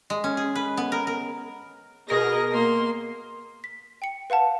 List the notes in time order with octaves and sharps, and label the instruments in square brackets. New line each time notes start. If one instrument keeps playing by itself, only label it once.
[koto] G#3
C#4
G#4
B4
B3
A#4
A#4
[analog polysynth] B2 A#4 A#6 [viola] G#4 D#5
[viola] A#3 C6
[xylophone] B6
G5 C#7
B4 F5 F#5 A5